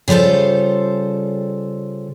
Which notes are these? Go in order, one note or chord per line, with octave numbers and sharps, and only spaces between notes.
C#3 G3 F4 A4 C5